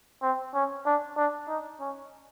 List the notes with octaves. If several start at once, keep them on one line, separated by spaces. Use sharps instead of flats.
C4
C#4
D4
D4
D#4
C#4